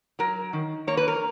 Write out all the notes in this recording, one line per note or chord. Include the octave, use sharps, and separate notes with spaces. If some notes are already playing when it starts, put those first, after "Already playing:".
F#3 A#4
D#3
A#3 C#5
B4
A#4